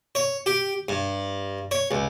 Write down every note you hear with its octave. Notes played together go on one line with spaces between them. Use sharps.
C#5
G4
G2
C#5
C#2